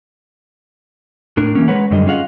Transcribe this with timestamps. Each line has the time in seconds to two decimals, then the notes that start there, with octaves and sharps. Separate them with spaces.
1.37 A2 D4 A#4
1.55 E3 A#3 C#4
1.68 G#3 A#4 B4 C#5 F#5
1.91 F#2 D3 G3 D#5
2.07 C#4 F4 G#4 D#5 F5 F#5